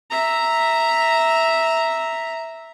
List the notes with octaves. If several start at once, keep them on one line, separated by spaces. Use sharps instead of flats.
E5 A#5